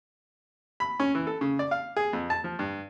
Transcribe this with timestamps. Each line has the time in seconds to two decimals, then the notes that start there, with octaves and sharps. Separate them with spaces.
0.80 B5
1.00 C#4
1.15 E3
1.27 A4
1.41 C#3
1.59 D5
1.71 F5
1.97 G#4
2.13 F2
2.30 A5
2.44 F3
2.59 G2